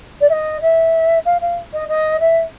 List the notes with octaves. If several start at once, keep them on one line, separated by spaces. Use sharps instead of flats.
D5
E5
D#5
E5
F5
F5
D#5
D#5
E5